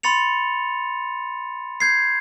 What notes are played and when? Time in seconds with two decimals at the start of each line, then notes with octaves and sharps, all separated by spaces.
0.03 B5 C6 A6 C#7 F7
1.80 G6 G#6 C7